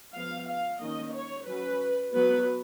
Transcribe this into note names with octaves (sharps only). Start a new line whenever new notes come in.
F3 B3 F5
F5
D#3 A#3 C#4 D#5
C#5
F#3 C#4 B4
F#3 B3 B4